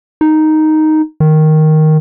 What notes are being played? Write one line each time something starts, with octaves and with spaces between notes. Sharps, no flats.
D#4
D#3